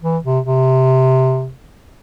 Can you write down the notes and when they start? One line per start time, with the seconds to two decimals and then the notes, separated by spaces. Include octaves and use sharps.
0.03 E3
0.24 C3
0.45 C3